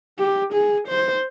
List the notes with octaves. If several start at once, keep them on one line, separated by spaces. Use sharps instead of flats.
G4
G#4
C5